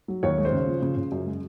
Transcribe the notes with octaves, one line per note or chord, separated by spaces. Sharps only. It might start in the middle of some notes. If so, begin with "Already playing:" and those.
F#3
D#2 C#5
G#3
C5
C#3
F3
C#3
C#3
F#2
G#3